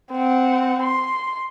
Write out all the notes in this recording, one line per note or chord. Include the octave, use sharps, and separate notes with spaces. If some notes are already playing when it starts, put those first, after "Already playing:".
C4 F#5
C6